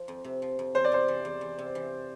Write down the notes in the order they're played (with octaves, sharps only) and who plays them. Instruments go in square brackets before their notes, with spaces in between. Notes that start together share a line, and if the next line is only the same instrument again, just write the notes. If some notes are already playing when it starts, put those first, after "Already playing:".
Already playing: [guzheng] F3
F2
C3
F3
F2
[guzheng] E2 [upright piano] C5
[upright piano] D5
[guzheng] C3 [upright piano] C5
[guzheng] E3
E2
E2
C3
E3